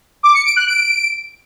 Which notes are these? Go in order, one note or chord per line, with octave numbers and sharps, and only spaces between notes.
D6
C#7
D7
F#6
D7